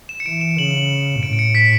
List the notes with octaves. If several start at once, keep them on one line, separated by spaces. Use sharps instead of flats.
E7
C#7
E3 D7
E7
C#3 F#7
A2 D7
D7
C#7
B6